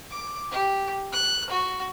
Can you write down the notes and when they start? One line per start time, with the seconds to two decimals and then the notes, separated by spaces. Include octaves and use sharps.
0.11 D6
0.51 G4
1.13 F#6
1.50 F#4